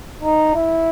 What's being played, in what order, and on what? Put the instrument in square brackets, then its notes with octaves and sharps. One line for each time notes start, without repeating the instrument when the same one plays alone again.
[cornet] D#4
E4